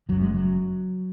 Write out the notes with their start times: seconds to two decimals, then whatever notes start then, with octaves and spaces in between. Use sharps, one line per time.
0.09 F#1 F#2 C#3 F#3
0.22 G#3
0.34 F#3